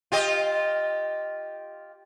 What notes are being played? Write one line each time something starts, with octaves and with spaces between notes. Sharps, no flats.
F4 G4 D#5